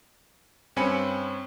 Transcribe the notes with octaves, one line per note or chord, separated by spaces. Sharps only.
G2 C4 C#4 G#5 B5 C#7